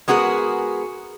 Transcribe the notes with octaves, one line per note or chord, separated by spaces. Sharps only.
G#3 B3 F#4 G#4 A#4